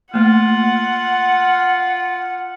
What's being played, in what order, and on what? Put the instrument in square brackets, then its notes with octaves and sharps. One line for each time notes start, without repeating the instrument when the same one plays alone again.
[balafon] A3 A#3 [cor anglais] F4 [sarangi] F#5